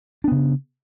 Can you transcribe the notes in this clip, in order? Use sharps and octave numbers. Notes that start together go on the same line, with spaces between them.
C#3 B3 D4